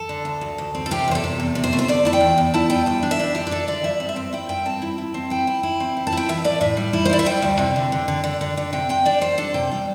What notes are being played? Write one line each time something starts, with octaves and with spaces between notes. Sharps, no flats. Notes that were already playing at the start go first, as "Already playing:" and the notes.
Already playing: A4
D3
D2
D2
D2
C4
A4
C3 G4
E2 C5
A4
C3
E2
C3
C5
A3
C5
D3 D5
E4 A5
G5
E2
E2
E4 A5
G3 G5
D2 G5
D4
E5
D4
D3 G4
G4
D4 A4
D3 D5
G2 E5
C4
E5
C4
E4 G5
G2 G5
C4 A5
E4
E4
C4
E4 G5
E4
E4
C4
E4
A5
E4 G5
E3 E5
A2 D5
A2 E5
G3
E4
C5
E4 D5
E5
G3 G5
D2
C3
D3
D3
D3
D3
D3
D3
C3 G5
C3 G5
D4 D5
G3 C5
D4 A4
C3 G5
G3